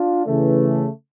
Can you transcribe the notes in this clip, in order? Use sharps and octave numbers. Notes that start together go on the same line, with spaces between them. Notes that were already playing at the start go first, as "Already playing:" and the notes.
Already playing: D4 F4
C#3 E3 A3